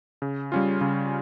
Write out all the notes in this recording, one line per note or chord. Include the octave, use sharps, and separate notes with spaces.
C#3
G3 C#4 F4
C#3